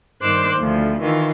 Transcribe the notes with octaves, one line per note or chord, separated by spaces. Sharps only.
G2 D#3 C5 D6 E6 F#6
D2 F3
D#3 E3 F4